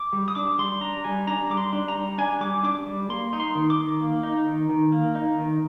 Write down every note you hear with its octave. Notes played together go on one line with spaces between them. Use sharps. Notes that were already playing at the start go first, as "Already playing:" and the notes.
Already playing: D6
G3
D#6
D4 D6
G3 C6
D4 A#5
G3 G#5
D4 A#5
G3 D6
C6
D4
A#5
G3
D4 G#5
G3 D6
D4 D6
G3
A#3 C6
D#4
C6
D#3
D6
D#3
A#3
D#4
D#3
D#3
A#3
D#4
D#3